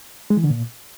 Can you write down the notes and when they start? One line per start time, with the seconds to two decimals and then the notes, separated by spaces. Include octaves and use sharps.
0.30 G#3
0.37 E3
0.44 D3
0.50 A#2